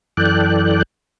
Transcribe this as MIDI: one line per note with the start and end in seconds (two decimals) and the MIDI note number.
0.17 0.83 42
0.17 0.83 52
0.17 0.83 69
0.17 0.83 74
0.17 0.83 79
0.17 0.83 90